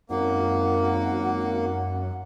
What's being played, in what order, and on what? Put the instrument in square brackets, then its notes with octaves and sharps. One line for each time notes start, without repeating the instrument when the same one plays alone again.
[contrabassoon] G#1 [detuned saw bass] F#2 [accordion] A#3 [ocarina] F#5